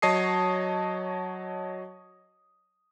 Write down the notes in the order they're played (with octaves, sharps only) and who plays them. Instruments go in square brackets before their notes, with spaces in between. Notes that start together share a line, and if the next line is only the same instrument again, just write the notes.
[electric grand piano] F#3 C#5 D#5 A5 D#6 C7